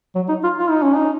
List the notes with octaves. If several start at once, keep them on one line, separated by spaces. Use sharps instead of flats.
F#3
D#4
F4
F4
D#4
C#4
D#4